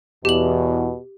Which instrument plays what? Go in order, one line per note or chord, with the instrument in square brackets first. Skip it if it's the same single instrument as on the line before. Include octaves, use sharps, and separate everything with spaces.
[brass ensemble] E2 [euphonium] B2 [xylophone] G4 F#7